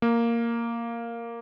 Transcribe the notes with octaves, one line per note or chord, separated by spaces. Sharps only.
A#3